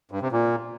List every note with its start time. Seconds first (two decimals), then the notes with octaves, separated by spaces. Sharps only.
0.11 G2
0.22 C3
0.32 A#2